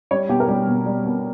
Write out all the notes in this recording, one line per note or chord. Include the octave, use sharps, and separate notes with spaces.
G3 C#5
B2 G4
A#4
G3 G4
B2
G3
B2